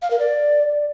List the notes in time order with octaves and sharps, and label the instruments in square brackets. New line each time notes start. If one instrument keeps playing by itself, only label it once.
[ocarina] F5
A#4
D5